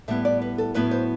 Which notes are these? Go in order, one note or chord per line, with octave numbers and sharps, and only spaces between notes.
A2 G3 B3 E4 E5
D5
B4
A4
A2 F#3 B3 E4 B4
C5